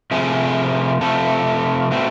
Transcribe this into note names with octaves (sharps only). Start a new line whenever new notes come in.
C3 F3 A3 G#4
C3 F3 A3 A4
B2 A3 C4